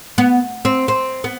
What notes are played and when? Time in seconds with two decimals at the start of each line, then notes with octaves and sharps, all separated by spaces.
0.18 B3
0.65 C4
0.88 C4
1.24 B3